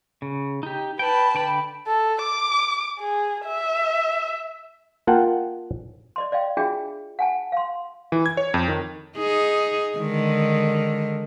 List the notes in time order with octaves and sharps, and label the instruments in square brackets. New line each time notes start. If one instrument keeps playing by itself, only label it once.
[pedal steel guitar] C#3
D#4 G4
[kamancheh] B4 A5 [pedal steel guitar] G5 B5
[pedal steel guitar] D3 G5 B5
[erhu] A4
D6
G#4
E5
[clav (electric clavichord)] A#3 F4 F#5 G5 A5
[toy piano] D5 D#5 C6
D5 D#5 F5 G5
D4 F4 F#4 G#4 E5 G5
F#5 G#5 A5
F5 C6
[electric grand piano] E3
G#6
C#5
F2
D#3
[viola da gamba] D#4 G#4
D3 D#3 G#3